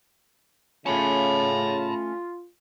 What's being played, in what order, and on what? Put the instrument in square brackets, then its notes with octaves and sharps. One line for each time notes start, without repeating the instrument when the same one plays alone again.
[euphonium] C#3 [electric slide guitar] A3 C#4 [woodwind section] F4 [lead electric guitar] A5 B5